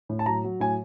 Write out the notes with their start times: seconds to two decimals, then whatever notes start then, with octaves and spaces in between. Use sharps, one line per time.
0.09 A2
0.19 A5
0.26 F#3 A#5
0.44 F#3
0.60 A2 G#5